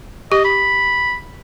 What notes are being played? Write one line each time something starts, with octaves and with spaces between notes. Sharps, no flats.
G4 D#5
B5